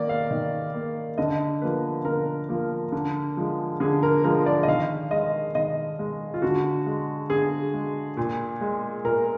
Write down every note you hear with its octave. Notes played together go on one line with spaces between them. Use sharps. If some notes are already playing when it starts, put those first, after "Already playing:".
Already playing: D#3 A#3 D5
F5
D#3
A#3
D3 D#5
F3 A#3 B4
D3 A#4
F3 A#3
D3
F3 G#3
D3 G#4
A#4
F3 G#3 A#4
D5
D#5
D#3 F5
G#3 D#5
D#3 D#5
G#3
F4
D3 F#4
G#3
D3 G#4
G#3
A#2
G#3
A#2 A#4